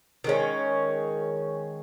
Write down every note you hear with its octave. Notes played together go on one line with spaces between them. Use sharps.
D#3 G#3 C#4